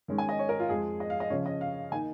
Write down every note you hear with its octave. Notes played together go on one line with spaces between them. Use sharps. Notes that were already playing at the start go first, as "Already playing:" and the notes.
D#3 G#3 C#4
G#5
D#5
C#5
A#4
F4
F2 F3 G#3 G#4
D#5
F5
D#5
C#3 F3 C#4 C#5
D#5
F5
D#3 A#3 D#4 G#5